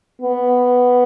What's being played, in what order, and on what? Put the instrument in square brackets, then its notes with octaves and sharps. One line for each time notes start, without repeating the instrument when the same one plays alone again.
[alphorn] B3